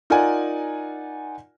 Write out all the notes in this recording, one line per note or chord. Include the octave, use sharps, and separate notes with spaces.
D#4 F4 A#4 D5 F#5 G#5